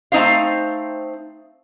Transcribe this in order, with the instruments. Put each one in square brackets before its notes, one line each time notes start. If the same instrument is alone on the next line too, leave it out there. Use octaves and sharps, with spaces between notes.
[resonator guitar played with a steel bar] A3 C4 D#4 C5 F5